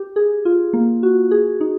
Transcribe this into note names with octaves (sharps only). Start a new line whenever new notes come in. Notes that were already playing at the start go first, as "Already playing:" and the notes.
Already playing: G4
G#4
F4
A#3
F#4
G#4
D#4